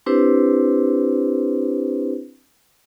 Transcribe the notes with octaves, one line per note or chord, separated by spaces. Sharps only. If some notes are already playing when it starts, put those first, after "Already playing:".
C4 D4 E4 G4 B4 C5